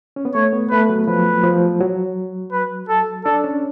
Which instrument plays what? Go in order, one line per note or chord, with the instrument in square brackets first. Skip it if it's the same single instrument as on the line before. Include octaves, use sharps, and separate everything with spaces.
[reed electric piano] C#4
B3
[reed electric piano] A3 [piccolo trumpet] C#5
[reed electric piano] B3
[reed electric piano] A3 [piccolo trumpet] B4
[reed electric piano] F#3
[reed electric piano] F3 [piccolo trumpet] B4
[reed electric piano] F3
F#3
[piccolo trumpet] B4
A4
[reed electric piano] D4 [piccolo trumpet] A4
[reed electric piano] C#4